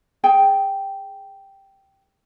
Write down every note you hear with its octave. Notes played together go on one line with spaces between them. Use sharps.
G#4 G5 G#5